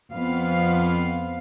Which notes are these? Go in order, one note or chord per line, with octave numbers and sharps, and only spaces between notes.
F2 B3 F5